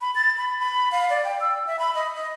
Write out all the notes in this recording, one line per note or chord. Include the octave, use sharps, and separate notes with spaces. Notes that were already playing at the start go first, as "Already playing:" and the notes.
B5
A6
B5
B5
F5
D5
G5
E6
E5
B5
D#5
D#5